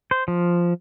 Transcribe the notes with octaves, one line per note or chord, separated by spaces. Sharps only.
C5
F3